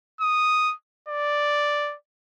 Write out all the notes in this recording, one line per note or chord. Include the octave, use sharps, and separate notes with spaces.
D#6
D5